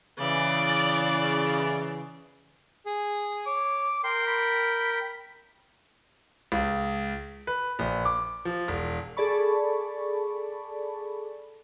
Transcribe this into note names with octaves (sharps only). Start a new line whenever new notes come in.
C#3 E3 D5
G#4
C#5 D6
A#4 G5 C6
B5
C#2
B4
A#1
D6
F3
E1
G#4 A4 D5 A5 B5 C#6